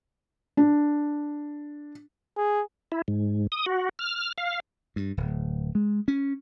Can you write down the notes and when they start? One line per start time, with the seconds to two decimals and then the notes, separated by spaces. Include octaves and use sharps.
0.57 D4
2.38 G#4
2.92 E4
3.08 G#2
3.52 D#6
3.66 F#4
3.99 F6
4.38 F5
4.96 G2
5.17 D1
5.75 G#3
6.08 C#4